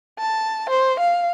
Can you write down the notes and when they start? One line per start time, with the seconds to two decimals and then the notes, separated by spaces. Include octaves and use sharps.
0.19 A5
0.69 C5
1.00 F5